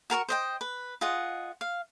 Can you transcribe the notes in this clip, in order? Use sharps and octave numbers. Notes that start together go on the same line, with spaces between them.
F#4 A#4 A5 C#6
C5 D#5 G5
B4
F4 G#4 D#5 F#5
F5